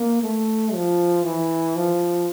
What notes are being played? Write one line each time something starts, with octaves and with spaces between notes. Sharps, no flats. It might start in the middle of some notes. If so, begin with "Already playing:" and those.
Already playing: A#3
A3
F3
E3
F3